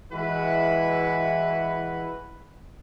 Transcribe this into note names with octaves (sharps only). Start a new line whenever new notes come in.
E3 G#3 E4 F#4 B4